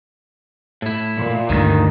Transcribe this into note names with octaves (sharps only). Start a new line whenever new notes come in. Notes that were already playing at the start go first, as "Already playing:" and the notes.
A2 E4
A#2
D2 G2 D#3